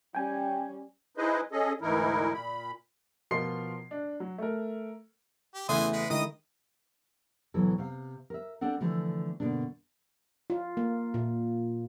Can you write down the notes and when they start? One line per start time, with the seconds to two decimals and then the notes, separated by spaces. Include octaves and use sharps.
0.15 G3 C#4 G5 G#5
1.17 D#4 E4 G#4 B4 C5 D#5
1.52 C#4 G#4 A4 D#5
1.81 D2 G#2 E3 D#4 E4 A#4
2.34 A#2 B5
3.31 B2 F3 F4 A#4 C6 C7
3.91 D4
4.20 F#3
4.38 A3 A#4
5.54 G4
5.69 E2 C#3 E3 A3 G#5 C6 D#6
5.93 G#3 B4
6.10 D3 D#3 G#3 E4 D#5 D#6
7.54 D2 B2 E3 F#3 A4
7.78 C3 F5
8.30 A#4 E5
8.61 C4 D4 A4 F#5
8.81 D3 E3 F3 A3
9.40 G2 B2 D3 D#3 A#3 D4
10.50 F4
10.77 A#3
11.14 A#2